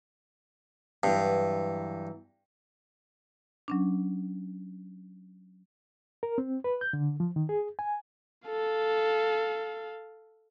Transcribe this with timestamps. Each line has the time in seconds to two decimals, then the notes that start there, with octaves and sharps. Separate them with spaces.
1.03 G2 E3 F#3 B3
3.68 F#3 C#4 D4
6.23 A#4
6.38 C4
6.64 B4
6.81 G6
6.93 D3
7.20 F3
7.36 D#3
7.49 G#4
7.79 G#5
8.48 A4 F5